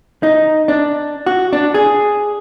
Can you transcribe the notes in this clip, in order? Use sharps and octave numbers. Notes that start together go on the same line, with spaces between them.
D#4
D4
F#4
D4
G#4